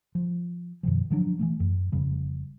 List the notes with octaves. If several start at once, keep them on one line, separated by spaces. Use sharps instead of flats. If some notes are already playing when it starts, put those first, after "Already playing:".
F3
F#2 B2 D#3 F3
D3 F3 F#3 D4
E3 F#3 A3
F#2
F1 F2 C#3 G3